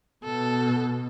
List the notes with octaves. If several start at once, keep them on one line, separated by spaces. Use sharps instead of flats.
B2 A4